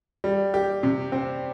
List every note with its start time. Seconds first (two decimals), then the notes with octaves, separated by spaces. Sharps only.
0.24 G3
0.54 G4
0.83 C3
1.12 C4